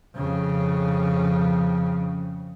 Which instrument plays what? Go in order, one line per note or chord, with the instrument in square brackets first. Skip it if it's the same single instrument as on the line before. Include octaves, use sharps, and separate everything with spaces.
[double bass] F2 C#3